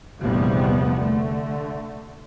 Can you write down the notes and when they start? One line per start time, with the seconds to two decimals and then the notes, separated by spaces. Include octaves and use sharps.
0.20 F1 A#1 E2 F3 G3 B3
0.98 D3 A3